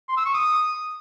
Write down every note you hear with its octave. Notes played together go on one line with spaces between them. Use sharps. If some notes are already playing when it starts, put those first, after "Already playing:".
C6
E6
C#6
D#6